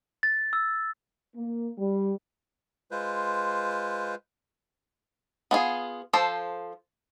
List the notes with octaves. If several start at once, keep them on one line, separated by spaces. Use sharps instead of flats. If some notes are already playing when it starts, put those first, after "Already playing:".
A6
E6
A#3
G3
G#3 F4 B4 C5
B3 F4 G#4
F3 A4 C5